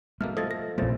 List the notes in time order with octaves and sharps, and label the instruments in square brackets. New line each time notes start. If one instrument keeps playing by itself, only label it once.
[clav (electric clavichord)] G#2 B2 A#3 [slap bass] A3 [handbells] F6
[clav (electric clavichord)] F3 D#5 [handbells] A4 G#6 A6
[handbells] A#6
[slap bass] A#1 A3 [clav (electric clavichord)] F2 A#2 C#3 [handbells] F4 C5 A6